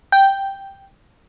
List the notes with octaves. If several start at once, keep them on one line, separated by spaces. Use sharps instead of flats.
G5